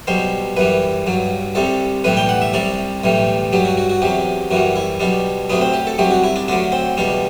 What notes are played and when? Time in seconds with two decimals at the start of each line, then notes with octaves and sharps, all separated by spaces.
0.07 B1 B2 G3 C5
0.57 F#2 E3 G3 B4
1.07 G2 F#3
1.55 C2 C3 G3 A4
2.04 B1 A2 E3 G3 B4
2.17 G5
2.29 F#5
2.42 E5
2.54 C2 C3 G3 D5
3.04 B1 A2 E3 G3
3.53 G2 F#3 G4
3.65 F#4
3.77 F#4
3.90 F#4
4.02 E2 C3 F#3 G4
4.51 F#2 E3 G3 F#4
4.76 E4
5.00 B1 B2 G3 D4
5.50 D2 C3 F#3 B3
5.61 C4
5.74 G4
5.87 A4
5.98 C2 C3 F#3 G4
6.11 F#4
6.24 E4
6.36 D4
6.48 D2 D3 F#3 D4
6.72 C4
6.97 E2 B2 G3 D4